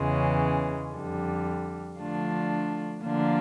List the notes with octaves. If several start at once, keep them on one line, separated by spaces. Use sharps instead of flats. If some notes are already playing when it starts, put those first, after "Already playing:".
Already playing: E2 C#3 E3 G#3 C#4
F2 D3 G3
D3 F3 A3 D4 F4
D3 F3 A#3 D4 F4